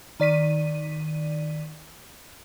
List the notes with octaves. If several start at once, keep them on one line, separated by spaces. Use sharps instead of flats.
D#3 D5 B6 D#7